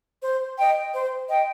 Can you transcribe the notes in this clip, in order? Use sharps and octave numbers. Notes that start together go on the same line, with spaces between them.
C5
D#5 G5
C5
D#5 G5